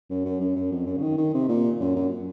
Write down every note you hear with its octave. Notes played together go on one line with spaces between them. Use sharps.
F#2
F#2
F#2
F#2
F2
F#2
C#3
D#3
D#3
C3
A#2
F#2
F#2